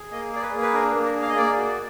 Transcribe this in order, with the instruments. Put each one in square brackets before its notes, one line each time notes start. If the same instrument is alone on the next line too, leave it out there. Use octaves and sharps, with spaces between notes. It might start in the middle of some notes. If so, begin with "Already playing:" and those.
Already playing: [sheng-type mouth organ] G#4
A#3 D#5
G#4 D5
B4
A#3
B4
D4 A#4
A#3
A#4
G#4
F5
D#5
A#3 D5
F#4